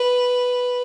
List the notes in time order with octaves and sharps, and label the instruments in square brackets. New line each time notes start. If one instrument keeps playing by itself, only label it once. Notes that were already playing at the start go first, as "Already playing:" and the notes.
Already playing: [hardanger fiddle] B4